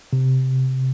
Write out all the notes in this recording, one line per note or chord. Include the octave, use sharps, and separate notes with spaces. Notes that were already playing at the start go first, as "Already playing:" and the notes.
C3